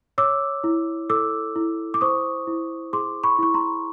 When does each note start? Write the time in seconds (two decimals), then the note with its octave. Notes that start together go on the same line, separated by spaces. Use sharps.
0.18 C#5 D6 E6
0.64 E4
1.10 A4 D6 E6
1.56 E4
1.94 D6
2.01 C5 C#6 D#6
2.47 E4
2.93 G#4 C6 D6
3.24 B5 C#6
3.39 E4 C#6
3.54 A#5 C6